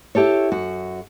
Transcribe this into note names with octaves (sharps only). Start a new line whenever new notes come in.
E4 G4 A4 C#5
F#2 F#4